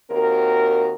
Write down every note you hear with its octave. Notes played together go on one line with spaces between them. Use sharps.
D#2 C4 F#4 A#4